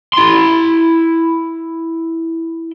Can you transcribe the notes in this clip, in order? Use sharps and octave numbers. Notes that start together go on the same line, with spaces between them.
E4 C6